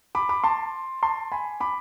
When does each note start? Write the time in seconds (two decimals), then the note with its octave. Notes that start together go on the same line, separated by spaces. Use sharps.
0.15 B5 D6
0.29 B5 D6
0.44 A5 C6
1.02 A5 C6
1.32 G#5 B5
1.60 B5 D6